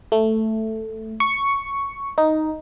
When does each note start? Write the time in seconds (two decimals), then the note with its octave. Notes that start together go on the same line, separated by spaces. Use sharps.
0.12 A3
1.20 C#6
2.18 D#4